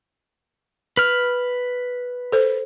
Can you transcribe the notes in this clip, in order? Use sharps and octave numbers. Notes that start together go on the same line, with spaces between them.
B4 F6
A4 C5